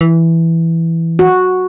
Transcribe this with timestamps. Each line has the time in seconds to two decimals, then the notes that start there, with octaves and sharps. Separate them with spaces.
0.01 E3
1.19 F#4